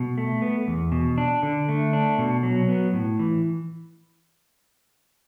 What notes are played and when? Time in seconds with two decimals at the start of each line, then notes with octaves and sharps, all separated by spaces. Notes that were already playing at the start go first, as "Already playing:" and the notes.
Already playing: B2
0.18 A3
0.42 B3
0.68 E2
0.92 B2
1.18 D4
1.43 D3
1.69 A3
1.93 D4
2.18 B2
2.43 F#3
2.69 B3
2.93 A2
3.19 E3